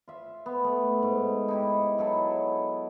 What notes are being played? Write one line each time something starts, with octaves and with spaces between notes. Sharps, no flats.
F4 E5
B3
A3
G#2
D#4 E4 G4
F#3 E4 A4